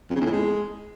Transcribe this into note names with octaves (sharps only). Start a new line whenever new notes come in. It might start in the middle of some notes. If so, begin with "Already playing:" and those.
F2
C#3
E2
A2
G#3